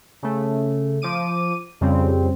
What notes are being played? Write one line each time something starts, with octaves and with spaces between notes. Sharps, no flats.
C#3 A3
F3 D6 D#7
F2 C#3 G3 C4